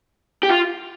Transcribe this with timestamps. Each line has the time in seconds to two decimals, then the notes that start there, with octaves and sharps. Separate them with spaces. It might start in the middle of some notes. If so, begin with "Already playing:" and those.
0.43 G4
0.50 F4